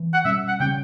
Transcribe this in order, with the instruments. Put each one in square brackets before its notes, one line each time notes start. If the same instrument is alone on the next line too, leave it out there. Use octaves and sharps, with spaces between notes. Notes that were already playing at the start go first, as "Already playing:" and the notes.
Already playing: [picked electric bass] E3
[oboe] F#5
[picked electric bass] B2 G3 C#4 [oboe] E5
[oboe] F#5
[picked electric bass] C#3 G3 C#4 [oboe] G5